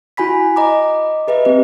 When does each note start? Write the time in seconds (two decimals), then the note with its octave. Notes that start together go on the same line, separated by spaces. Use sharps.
0.17 E4 F#4 G#5 B5 B6
0.56 D#5 A#5 D6
1.28 G#4 B4 D#5 E5
1.45 C4 G4 B4